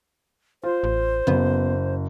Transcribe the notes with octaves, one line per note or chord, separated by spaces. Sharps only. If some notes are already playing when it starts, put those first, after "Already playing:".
F4 C5
A1
F#1 B3